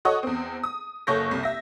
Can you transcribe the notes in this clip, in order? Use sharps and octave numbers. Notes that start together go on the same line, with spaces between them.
F#4 A4 C#5 D#5 C#6 D#6
E2 C4
D#6
F#1 A4 C#5 C#6 G6 A#6
C2
E5 A#6